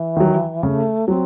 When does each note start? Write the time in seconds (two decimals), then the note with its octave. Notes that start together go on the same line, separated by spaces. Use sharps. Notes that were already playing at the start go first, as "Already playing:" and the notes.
Already playing: E3
0.17 D#3 F#3
0.63 C#3 A3
1.08 F#3 C4